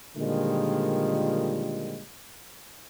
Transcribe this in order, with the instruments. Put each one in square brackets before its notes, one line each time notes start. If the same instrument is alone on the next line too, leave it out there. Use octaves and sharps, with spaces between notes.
[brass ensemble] A#2 D3 D#3 F3 G3 G#3